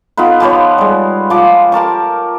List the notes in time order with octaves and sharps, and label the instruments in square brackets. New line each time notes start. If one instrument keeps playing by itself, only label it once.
[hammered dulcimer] B3 D#4 F4 B4
F3 G4 B4 C#5
G3 G#3
F3 D6
G4 A#4 A5 C#6